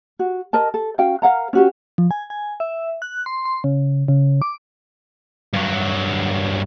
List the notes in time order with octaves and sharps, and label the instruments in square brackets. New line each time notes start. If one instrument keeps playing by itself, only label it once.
[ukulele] F#4
A#4 D#5 A5
A4
C#4 F#4 F5 G5
A#4 F5 F#5 A#5
C#4 F#4 G4
[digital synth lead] F3
G#5
G#5
E5
F#6
C6
C6
C#3
C#3
D6
[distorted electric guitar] G2 F#3